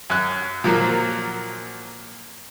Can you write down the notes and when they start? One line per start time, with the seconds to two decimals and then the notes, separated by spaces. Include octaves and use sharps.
0.10 F#2 F#6
0.64 A#2 F3 F#3 A#3